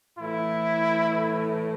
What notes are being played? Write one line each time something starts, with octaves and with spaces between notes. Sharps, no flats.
A2 E3 E4